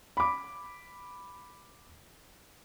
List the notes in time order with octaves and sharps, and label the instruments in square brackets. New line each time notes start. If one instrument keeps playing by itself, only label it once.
[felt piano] B5 D6